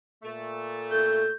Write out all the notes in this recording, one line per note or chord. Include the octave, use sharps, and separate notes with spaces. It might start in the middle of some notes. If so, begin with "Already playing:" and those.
A#2 A3
A4 G6